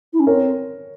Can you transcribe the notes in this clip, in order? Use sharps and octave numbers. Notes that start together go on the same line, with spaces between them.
E4
C#4
C4 A#4 C#5